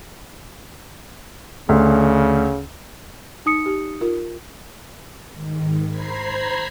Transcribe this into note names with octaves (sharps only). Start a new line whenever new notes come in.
D2 C#3
D#4 D#6 C#7
G4
F4 A#4
G#2 D#3
C5 A#5 B5 G#6 B6 C7